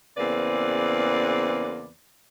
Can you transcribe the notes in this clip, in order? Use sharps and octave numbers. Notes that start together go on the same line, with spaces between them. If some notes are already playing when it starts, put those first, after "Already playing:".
E2 C#3 A#3 C4 B4 D5